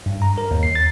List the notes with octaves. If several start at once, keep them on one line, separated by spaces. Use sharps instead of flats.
G2
A#5
A#4
D#2
C7
A6